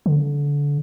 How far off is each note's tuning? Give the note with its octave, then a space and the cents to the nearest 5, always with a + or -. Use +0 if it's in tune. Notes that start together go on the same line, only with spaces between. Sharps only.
D3 -25